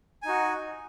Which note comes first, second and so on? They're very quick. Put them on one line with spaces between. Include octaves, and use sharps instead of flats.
G#5 D#4 F#4